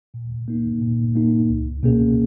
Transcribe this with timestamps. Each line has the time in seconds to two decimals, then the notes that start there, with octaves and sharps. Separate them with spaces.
0.14 A#2
0.48 A#3 D#4
0.81 A#2
1.15 A#3 D#4
1.48 C#2
1.83 B2 A#3 C#4 G#4